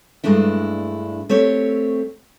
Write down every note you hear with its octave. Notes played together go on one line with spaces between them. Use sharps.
G2 E3 G#3 A3 D4 E4
A3 C4 G4 C#5